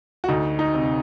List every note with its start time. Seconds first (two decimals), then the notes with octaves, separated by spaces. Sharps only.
0.24 F#4
0.29 D2 D#4
0.59 D#4
0.74 C3